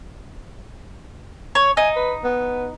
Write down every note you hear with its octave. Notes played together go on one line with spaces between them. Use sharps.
C#5
D#4 G#5
B4
B3